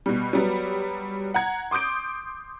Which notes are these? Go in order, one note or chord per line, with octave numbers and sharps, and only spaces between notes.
B2 G3
F#3 G3 B3
F#5 A#5 G#6
C6 D6 D#6 G6 D7